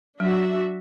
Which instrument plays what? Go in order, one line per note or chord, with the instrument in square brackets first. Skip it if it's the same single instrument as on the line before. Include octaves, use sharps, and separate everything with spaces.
[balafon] F#3 [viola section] D4 F#4 E5